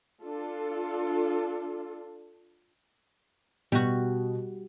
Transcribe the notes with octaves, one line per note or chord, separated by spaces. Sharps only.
D4 F4 A4
B2 G3 F#4